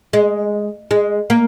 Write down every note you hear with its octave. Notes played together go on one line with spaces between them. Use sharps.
G#3
G#3
A#3